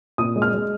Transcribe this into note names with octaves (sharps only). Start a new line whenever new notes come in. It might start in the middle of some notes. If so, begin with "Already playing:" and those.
A#2 D#6
G#3
F6
G#3